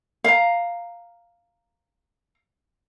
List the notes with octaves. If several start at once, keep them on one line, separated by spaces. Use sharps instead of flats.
F5 A#5